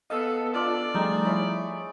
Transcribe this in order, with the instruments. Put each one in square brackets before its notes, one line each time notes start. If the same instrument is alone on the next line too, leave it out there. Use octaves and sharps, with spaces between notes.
[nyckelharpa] B3 A4 [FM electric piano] D#5 [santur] F5 A5 E6
[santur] D4 F4 [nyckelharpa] D5
[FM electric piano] F3 G3 A3 [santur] D#4 G#4
[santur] E4 G#4 C#5